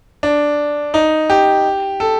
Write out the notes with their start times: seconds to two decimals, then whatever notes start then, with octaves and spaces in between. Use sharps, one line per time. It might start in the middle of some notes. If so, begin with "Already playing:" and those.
0.23 D4
0.94 D#4
1.30 G4
2.00 A4